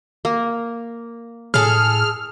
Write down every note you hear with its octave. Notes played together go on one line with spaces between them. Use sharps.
A#3
A2 G#4 A4 F6